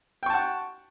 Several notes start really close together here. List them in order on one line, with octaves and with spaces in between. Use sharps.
G5 C#6 A5 F#5